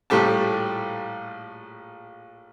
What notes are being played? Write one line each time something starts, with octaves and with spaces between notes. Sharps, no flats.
A#1 A2 G3 A3 G4 A5